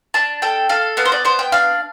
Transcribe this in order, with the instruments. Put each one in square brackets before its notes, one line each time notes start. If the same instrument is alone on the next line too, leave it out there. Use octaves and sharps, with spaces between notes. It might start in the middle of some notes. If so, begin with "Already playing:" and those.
[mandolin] D4 A5
A4 G5
A4 F5
B3 F5
C5
D5
B3 C5
G5
D4 F5